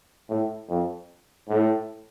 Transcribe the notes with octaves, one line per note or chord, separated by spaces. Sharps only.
A2
F2
A2